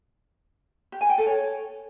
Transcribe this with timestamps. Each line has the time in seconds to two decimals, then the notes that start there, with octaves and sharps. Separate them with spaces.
0.92 G4
1.01 G#5
1.09 G5
1.18 A4
1.26 C#5